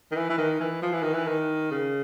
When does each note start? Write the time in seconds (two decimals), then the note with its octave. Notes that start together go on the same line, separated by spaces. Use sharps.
0.11 D#3
0.16 E3
0.29 E3
0.38 D#3
0.60 E3
0.82 F3
0.93 E3
1.03 D#3
1.13 E3
1.27 D#3
1.71 C#3